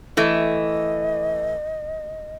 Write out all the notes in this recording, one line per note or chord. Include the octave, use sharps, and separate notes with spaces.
E3 A3 D#5